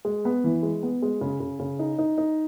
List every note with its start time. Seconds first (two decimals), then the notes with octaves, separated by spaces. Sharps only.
0.05 G#3
0.25 B3
0.44 E3
0.63 G#3
0.83 B3
1.02 G#3
1.21 C#3
1.40 C#3
1.59 C#3
1.79 D#4
1.99 D#4
2.18 D#4